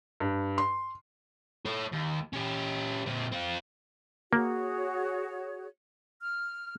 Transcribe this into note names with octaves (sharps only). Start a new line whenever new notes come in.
G2
C6
A4 C#5
D#2
C#4 G4
A#2 C4
C4 F4
A#3 F#4 G#4 C#5
F6